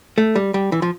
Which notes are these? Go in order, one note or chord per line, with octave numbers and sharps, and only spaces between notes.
A3
G3
G3
E3
F3